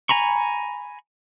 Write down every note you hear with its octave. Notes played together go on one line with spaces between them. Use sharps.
G#5 A#5 B5 C#6